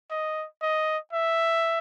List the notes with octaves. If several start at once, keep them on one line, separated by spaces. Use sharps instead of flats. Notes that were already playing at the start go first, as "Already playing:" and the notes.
D#5
D#5
E5